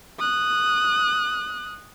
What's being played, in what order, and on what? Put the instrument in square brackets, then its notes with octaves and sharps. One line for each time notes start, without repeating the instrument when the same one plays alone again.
[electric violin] D#6 F#6